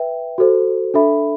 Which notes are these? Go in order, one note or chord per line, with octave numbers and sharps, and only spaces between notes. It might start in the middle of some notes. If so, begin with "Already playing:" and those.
Already playing: B4 E5 G5
F#4 A4 C5
D4 A4 E5 B5